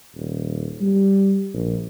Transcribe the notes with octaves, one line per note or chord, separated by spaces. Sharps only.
D#1
G3
A#1